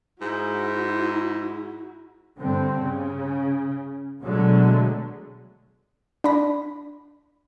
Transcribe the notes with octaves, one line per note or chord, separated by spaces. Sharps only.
G#2 E4 F#4
G2 D3 C4
C#3
B2 D3 F#3 G#3 A3
D4 D5 B5 A#6